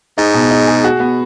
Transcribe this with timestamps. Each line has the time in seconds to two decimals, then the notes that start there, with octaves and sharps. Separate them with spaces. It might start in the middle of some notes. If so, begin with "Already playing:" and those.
0.18 G#2 D#4
0.34 B2
0.51 D#4
0.68 G#4
0.84 F#4
1.00 B3